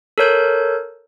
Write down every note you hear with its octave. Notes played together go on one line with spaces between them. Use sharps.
A4 A#4 C#5 G6